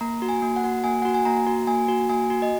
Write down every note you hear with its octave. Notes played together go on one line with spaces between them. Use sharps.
A#3 A#5
F#4
G#5
A#3
F#5
F#4
A#3 G#5
F#4 F#5
G#5
A#3 A#5
F#4
A#3 G#5
F#4
A#3 G#5
F#4
D#5